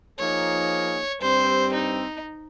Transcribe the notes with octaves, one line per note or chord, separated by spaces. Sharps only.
F3 A#3 D#4 G#4 C#5
G2 G3 C4 C5
D#4